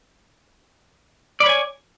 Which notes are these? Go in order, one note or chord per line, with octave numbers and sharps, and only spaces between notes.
C#5 D5 G#5 B5